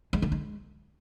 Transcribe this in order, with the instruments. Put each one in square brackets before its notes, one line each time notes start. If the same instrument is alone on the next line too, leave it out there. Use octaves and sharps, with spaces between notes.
[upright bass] G#3
D3
G#3